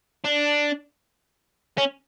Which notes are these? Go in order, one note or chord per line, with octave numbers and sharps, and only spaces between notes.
D4
C#4